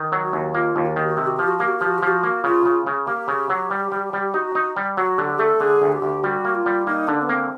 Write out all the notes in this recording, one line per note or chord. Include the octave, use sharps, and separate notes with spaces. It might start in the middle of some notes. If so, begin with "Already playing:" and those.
Already playing: D#3
F#3
F#4
D#2
A#3 F4
D#2
F#4
D#3 G4
F#4
C3 G4
F#4
F3 G4
F#4
A#3 G4
F#4
F3 G4
F#4
F3 G4
F#4
A#3
C#3 F4
C#3
C#3
A#3 G4
C#3
F#3
G3
G3
G3
D#4 F#4
D#4
G3
F#3 F#4
D3 G4
A3 A4
D3 G#4
D2
G4
D2
G3 F#4
A#3
F4
G3
A#3 D#4
D3 D4
B3
A#3 C4